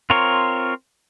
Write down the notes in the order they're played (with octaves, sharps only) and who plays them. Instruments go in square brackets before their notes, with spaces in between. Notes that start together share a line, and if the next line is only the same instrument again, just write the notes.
[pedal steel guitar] C4 F4 A#4 C#5